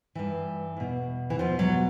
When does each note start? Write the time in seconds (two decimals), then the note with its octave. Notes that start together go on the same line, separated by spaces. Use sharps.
0.15 G2 E3
0.77 E2 B2
1.30 E3
1.39 E2 B2 F3
1.59 F#3